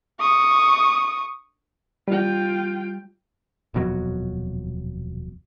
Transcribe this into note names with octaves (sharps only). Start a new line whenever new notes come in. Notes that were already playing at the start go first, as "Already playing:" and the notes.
C#6 D#6
G3 F4 G5
D#1 F2 B2 F#3